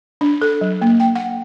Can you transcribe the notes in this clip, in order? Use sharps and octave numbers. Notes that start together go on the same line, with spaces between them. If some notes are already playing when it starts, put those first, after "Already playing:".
D4
A4
F#3
A#3
G5
F#5